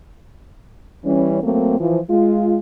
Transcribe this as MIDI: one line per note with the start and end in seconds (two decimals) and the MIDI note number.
1.05 1.38 52
1.05 1.38 55
1.05 1.38 61
1.43 1.80 54
1.43 1.80 57
1.43 1.80 58
1.43 1.80 60
1.80 1.99 52
1.80 1.99 53
2.10 2.58 56
2.10 2.58 65